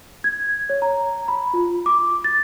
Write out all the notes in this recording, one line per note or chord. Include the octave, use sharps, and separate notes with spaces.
G#6
C#5
A#5
B5
F4
D6
A6